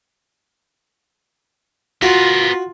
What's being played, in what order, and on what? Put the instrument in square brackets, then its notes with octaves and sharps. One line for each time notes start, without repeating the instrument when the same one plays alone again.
[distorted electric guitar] B3 A#4 [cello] F4 [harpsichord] F#4